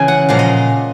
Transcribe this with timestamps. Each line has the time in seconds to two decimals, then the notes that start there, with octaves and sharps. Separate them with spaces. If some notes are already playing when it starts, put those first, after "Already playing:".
Already playing: C#3 E3 G#5
0.08 F#5
0.29 A#2 F3 G#3 F5
0.39 D#5